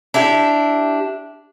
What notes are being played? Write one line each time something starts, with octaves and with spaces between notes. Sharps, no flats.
D4 E4 G4